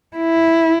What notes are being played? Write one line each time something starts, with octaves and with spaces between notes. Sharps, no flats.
E4